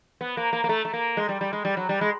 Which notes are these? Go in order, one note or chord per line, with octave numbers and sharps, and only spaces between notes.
B3
A#3
A#3
A#3
A3
A3
A#3
G#3
G3
G3
G#3
G3
F#3
G3
G#3